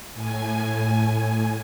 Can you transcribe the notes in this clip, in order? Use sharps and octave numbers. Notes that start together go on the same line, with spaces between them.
A2 G#5